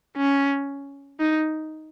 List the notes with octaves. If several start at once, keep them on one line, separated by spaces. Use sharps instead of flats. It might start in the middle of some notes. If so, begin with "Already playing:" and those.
C#4
D#4